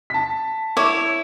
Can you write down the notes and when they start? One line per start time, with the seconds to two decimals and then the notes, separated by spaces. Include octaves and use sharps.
0.10 A5 B6
0.77 E4 C#5 D6